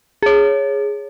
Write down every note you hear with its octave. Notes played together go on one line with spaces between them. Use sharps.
G#4 C#5